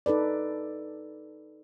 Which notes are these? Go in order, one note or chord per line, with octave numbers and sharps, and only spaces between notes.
D#4 A4 B4 D5